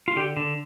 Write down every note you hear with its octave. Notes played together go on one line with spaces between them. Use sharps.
F4
D3 G4
D3